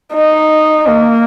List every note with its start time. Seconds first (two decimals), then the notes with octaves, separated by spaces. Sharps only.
0.14 D#4
0.88 A#3